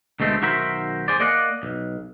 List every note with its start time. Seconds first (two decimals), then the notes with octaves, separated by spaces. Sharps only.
0.20 D2 B2 G#3 A3 C4
0.42 B1 D#3 F#4 A#4 C5 E5
1.08 G#4 C5 D5
1.20 A#3 D5 D#5 F#5
1.63 B1